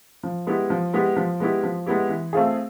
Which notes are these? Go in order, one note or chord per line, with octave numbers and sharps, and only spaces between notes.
F3
G#3 B3 E4 G4
F3
G#3 B3 E4 G4
F3
G#3 B3 E4 G4
F3
G#3 B3 E4 G4
E3
A3 C4 F4 G#4